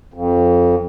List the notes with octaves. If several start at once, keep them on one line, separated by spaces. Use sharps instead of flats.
F2